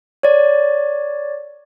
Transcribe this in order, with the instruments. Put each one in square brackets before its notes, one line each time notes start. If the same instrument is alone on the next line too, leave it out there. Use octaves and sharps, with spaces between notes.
[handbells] C#5 D5